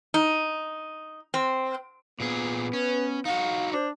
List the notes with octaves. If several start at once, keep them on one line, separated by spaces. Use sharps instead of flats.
D#4
C4
A#2 B3 G#4
C#4 B4
D#4 F#4 F5
D4 C5